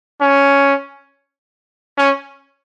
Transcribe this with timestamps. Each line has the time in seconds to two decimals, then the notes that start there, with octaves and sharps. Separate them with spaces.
0.21 C#4
1.98 C#4